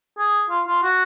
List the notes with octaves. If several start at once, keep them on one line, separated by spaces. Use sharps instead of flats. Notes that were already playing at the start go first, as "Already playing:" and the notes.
G#4
F4
F4
F#4